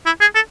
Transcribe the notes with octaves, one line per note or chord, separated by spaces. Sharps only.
E4
G#4
A4